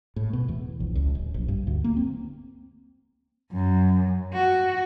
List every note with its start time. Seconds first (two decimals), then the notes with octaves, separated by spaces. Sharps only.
0.16 A2
0.33 B2
0.48 E2
0.80 A#1
0.95 C#2
1.15 D1
1.34 A#1
1.48 G2
1.67 D2
1.84 A#3
1.97 C4
3.52 F#2
4.34 F#4